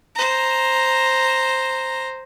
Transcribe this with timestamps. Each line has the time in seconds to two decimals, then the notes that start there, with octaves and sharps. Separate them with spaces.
0.15 C5 A#5